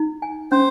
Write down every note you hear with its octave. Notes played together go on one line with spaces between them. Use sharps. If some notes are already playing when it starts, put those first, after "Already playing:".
Already playing: D#4
G#5
C#4 C5